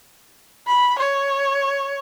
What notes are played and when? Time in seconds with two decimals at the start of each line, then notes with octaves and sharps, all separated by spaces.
0.67 B5
0.98 C#5